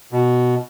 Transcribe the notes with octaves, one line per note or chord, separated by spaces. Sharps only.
B2